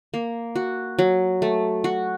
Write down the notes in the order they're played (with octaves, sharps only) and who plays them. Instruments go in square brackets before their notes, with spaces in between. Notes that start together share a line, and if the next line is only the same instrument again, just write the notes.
[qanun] A#3
F#4
F#3
A3
F#4